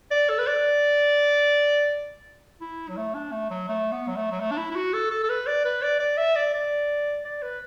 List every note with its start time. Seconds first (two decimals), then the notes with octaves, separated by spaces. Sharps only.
0.11 D5
0.29 A4
0.38 B4
0.47 D5
2.60 E4
2.89 F#3
2.97 A3
3.14 D4
3.32 A3
3.50 F#3
3.69 A3
3.92 B3
4.08 F#3
4.16 A3
4.31 F#3
4.40 A3
4.51 D4
4.57 E4
4.71 E4
4.75 F#4
4.93 A4
5.10 A4
5.23 A4
5.29 B4
5.47 D5
5.65 B4
5.82 D5
6.00 D5
6.17 E5
6.36 D5
6.54 D5
7.24 D5
7.42 B4